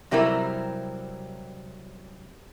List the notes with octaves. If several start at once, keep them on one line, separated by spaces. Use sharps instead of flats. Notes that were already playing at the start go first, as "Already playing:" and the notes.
C3 F#3 G3 C4 E4 A#4